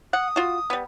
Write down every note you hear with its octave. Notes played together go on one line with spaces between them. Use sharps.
F#5 D#6
F4 F#4
G3 B3